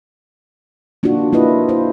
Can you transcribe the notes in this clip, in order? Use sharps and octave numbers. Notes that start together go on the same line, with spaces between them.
A#3 D4 D#4 F4 F#4
A#3 E4 F4 B4 D#5
E4 C5